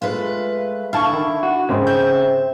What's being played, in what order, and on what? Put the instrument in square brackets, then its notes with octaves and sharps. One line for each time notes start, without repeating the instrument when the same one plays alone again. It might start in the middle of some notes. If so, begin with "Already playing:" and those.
[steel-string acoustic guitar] G#3 A3 B4 [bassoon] F4
[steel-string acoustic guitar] D3 E5 [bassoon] E4 [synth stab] F5 A5 C#6
[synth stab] D#3
[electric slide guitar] F#4
[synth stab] G#2 G#3 A#3 [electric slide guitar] C#3 [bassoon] C4
[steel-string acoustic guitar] E5 [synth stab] G6